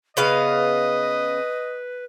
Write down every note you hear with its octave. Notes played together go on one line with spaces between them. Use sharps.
C#3 B3 B4 D#5 F5